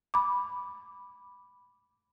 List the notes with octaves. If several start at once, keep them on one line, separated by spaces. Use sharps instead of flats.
B5 D6